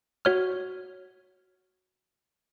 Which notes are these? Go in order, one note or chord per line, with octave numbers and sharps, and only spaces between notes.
F#4 C#5 F6